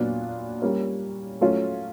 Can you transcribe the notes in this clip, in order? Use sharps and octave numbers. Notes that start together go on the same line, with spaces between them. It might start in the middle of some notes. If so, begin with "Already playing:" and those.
Already playing: A#2 F#3 B3 D4 F4
G3 A#3 C#4
F#3 A3 C#4 F4